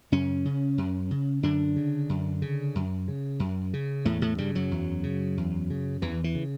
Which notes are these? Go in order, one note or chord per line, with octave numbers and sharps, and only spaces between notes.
F#2 C#3 C#4
C#3
F#2
C#3
F#2 D3 D4
C#3
F#2
C#3
F#2
C#3
F#2
C#3
E2 A2 A3
A2 A3
G2 C#3 G3
F#2 F#3
E2
C#3
E2
C#3
E2 E3
E3
C#3